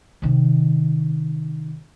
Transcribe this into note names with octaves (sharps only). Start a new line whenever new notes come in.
C3 D#3